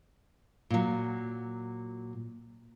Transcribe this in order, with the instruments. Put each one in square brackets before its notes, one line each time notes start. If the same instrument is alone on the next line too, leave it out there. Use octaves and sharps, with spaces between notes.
[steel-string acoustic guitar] A#2 F#3